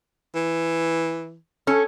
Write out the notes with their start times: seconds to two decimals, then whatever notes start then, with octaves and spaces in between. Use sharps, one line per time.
0.35 E3
1.67 C#4 A4